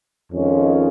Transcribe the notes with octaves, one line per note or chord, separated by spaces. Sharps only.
F2 D#3 G#3 C#4 F4